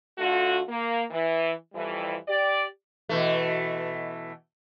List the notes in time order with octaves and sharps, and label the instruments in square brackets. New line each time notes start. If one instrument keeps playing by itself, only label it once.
[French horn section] D3 A3 F4 F#4
A#3
E3
F2 E3 G3
G4 D5
[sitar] B2 E3 A3